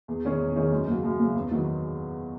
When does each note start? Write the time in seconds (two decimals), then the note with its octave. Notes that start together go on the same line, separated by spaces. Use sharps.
0.08 E2
0.25 D#3 G#3 C#4 G#4
0.40 E2
0.56 D#3 G#3 C#4 G#4
0.72 F#2
0.88 C#3 F#3
1.04 F#2
1.20 C#3 F#3
1.35 E2
1.51 D#3 F#3 B3